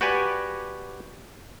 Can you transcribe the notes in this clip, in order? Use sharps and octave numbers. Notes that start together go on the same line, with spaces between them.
F#4 G4 B4 D5 G#5